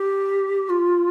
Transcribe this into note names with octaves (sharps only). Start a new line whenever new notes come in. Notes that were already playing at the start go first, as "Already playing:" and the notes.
Already playing: G4
F4